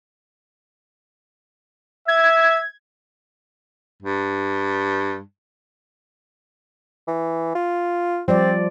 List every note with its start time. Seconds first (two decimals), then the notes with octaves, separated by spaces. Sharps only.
2.08 E5 G#6
4.02 G2
7.08 E3
7.55 F4
8.28 F3 G3 C4 D5